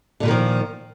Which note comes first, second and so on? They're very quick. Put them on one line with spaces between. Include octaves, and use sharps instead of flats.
D3 A#2 A#3 D#3 F3